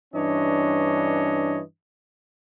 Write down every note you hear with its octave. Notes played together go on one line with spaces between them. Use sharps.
G2 E3 C#4 D4 C#5 D#5